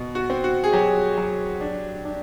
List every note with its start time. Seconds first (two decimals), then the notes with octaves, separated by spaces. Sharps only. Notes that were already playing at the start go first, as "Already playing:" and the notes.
Already playing: B2
0.15 F#4
0.30 C4
0.44 F#4
0.64 G#4
0.73 F#3 G4
1.18 F#3
1.61 D4
2.05 D4